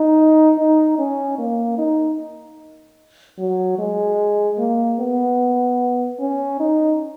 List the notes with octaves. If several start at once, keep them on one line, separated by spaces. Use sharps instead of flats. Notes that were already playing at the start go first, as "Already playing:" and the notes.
Already playing: D#4
D#4
C#4
A#3
D#4
F#3
G#3
A#3
B3
C#4
D#4